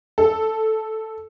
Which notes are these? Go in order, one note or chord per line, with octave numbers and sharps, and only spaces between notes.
A4